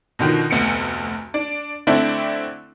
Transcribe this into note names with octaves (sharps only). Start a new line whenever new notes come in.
B2 D3 D#3 F3
F1 D2 B3 C#7 D7
D4
D3 A3 C4 D4 E4